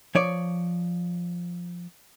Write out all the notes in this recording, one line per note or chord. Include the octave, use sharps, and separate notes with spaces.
F3 C#5 D5